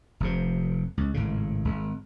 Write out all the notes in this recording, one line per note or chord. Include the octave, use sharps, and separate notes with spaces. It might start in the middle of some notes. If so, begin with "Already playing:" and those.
F1 F2 C3
C#2
G#1 A2 C#3
G#1